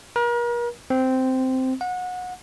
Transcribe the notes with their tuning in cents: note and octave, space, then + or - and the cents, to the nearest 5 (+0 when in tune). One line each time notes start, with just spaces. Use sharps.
A#4 +40
C4 -10
F#5 -25